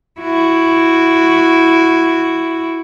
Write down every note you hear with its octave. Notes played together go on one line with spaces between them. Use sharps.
E4 F#4